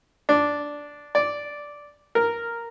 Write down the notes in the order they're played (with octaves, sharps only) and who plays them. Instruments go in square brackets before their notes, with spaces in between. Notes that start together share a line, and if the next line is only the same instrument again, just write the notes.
[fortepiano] D4
D5
A#4